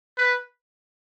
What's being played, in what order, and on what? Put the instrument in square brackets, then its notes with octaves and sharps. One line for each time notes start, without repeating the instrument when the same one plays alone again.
[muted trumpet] B4